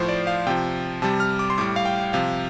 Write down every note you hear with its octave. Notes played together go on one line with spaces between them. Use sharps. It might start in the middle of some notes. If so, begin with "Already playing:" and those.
Already playing: A2 F3 C5
D5
F5
C3 F3 G5
C3 G3 A5
F6
D6
C6
A2 G3 D6
F5
G5
C3 F3 F5